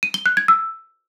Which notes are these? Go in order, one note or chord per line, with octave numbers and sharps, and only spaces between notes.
D#7
G7
F#6
G#6
E6